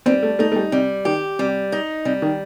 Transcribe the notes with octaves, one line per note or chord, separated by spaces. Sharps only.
G3 C4
A3
A3 D#4
A3
G3
C3 G3
D#3 G4
C3 G3
D#4
C3 G3
D#3